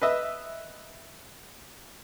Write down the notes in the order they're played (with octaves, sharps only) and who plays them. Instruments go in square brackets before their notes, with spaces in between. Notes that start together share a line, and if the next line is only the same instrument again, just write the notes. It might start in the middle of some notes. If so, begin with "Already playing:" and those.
[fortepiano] B4 D#5 E5